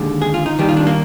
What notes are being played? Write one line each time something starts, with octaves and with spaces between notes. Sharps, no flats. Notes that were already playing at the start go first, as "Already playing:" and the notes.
Already playing: D#2 D3 G#3
G#4
F4
D#4
D#2 D#3 G3 G4
F4
D4
A#3